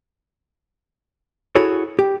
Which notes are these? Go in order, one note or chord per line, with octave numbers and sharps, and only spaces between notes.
E4 F#4 G#4 A4 C#5
G4